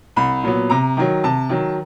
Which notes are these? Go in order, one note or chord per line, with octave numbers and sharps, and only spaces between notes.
C2 B5
A#2 F#3 B3
C3 A#5
D#3 F#3
C3 A5
D#3 F#3